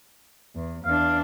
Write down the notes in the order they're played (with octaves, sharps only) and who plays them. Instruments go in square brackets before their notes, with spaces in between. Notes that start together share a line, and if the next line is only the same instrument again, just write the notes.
[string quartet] E2
[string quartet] E2 D4 [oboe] F5